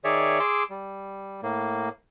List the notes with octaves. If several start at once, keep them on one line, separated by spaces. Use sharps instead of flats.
D#3 G#4 C#5 D5 E5
G#4 C6 D6 E6
G3
A2 A#3